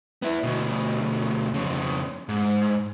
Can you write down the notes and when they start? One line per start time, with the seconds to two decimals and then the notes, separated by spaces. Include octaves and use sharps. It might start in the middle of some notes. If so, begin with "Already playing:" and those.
0.22 B3 E4
0.43 D2 B2
1.54 F2 C#3
2.29 G#2